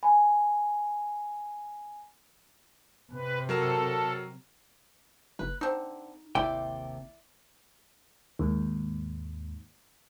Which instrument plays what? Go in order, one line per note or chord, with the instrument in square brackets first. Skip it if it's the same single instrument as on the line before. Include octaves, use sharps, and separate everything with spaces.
[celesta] G#5 B5
[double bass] C3 [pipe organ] B4
[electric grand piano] F#3 A#4 E7 [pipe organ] A4
[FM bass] F#1 [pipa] B4
[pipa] D3 C4 [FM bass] D#4
[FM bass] G#1 [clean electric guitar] D#2 C3 G5 [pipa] E4 D5
[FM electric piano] D#2 G#2